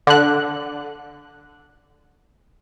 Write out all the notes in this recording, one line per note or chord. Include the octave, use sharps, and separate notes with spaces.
D3 F#6